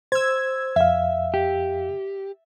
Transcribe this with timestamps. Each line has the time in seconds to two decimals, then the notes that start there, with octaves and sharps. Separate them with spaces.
0.12 C5 E6 G#6
0.76 F2 E5 F5
1.34 G4